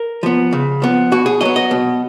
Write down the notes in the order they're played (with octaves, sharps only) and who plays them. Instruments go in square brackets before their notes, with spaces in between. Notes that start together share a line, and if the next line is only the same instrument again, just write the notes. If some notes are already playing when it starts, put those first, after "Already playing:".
Already playing: [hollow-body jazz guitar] A#4
F3 B3
C#3
F3 B3
B2 F#4
G#4
F#3 B3 D#5
D#5
B2